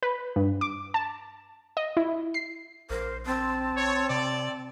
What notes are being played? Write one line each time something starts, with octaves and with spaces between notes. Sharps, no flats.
B4
G2
D6
A5
D#5
E4
C7
A#1 A#4 C5
C4 A5
C#5
C3 D5